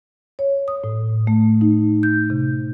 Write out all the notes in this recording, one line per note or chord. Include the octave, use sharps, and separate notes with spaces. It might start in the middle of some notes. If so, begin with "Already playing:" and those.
C#5
D#6
A2
A3
D#4
G6
C3